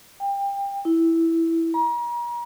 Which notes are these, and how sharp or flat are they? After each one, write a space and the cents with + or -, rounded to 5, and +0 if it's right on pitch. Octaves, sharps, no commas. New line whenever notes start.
G5 +25
E4 +0
A#5 +40